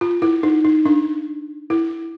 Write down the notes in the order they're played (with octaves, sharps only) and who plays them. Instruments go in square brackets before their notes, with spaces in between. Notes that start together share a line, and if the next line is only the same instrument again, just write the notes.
[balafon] F4
E4
D#4
D#4
D4
E4